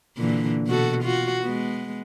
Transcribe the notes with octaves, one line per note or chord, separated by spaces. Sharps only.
A#2 D3 E3
B2 F#4 A4
F4 F#4
G#3 B3